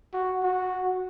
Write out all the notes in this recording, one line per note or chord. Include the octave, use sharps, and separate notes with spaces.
F#4
F#4